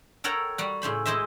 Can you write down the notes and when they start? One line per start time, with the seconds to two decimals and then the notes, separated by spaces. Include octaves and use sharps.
0.24 A4 A#4 C#5 F#5 G5
0.58 G3 F#4
0.82 A2 C#3 C5 B5
1.06 G#3 E4 C5 D#5 E5